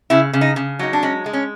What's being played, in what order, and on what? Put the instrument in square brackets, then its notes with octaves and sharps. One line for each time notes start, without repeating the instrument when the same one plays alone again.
[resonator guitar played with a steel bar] C#3 E4
C#3
D#4
C#3
F#3 D#4
D4
G#3 C#4
G#3
C#4